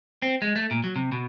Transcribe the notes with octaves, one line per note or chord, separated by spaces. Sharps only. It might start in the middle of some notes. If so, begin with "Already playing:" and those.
C4
G#3
A3
A#2
F#3
C3
B2